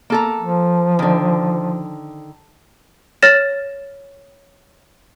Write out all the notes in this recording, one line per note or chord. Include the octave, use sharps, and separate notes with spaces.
A#3 A4 A#5
F3
D3 D#3
C#5 F6 A6 A#6 E7